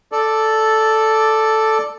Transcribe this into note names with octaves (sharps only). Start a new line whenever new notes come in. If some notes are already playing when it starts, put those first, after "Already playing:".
A4 D5